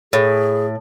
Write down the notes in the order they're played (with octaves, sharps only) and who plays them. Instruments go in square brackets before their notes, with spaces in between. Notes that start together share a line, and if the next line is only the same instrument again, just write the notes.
[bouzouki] A2 [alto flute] G#4